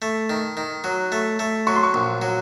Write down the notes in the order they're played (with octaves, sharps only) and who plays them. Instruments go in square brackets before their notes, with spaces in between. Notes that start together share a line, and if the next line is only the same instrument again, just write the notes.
[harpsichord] A3
D#3
D#3
F#3
A3
A3
[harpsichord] F#3 [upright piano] C#6
[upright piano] C6
C#6
[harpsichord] A#1
F#3